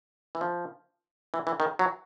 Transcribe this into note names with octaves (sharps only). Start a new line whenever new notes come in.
E3
F3
E3
E3
D#3
F#3